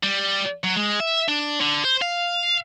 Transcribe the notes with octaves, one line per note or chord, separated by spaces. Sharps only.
G3
F#3
G#3
E5
D4
D3
C5
F5